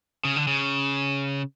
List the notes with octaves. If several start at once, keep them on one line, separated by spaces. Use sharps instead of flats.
C#3
D3
C#3